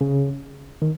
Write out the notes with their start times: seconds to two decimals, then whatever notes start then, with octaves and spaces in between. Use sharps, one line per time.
0.01 C#3
0.82 D#3